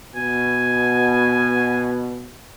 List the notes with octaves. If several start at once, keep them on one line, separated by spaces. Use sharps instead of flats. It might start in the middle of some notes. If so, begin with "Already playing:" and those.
B2 G#5